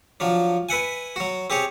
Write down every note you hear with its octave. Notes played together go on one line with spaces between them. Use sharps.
F3 F#3 D4
B4 E5 F#5 G#5
F#3 F#4
C4 G4 G#4 C#5